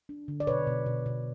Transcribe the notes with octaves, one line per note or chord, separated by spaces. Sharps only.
D4
D3
D5
B2 B4 C#5
B2
B2
B2